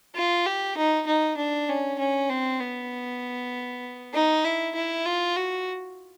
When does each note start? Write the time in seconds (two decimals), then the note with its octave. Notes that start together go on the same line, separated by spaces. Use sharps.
0.15 F4
0.46 G4
0.77 D#4
1.07 D#4
1.37 D4
1.69 C#4
1.99 C#4
2.29 C4
2.60 B3
4.14 D#4
4.45 E4
4.75 E4
5.05 F4
5.36 F#4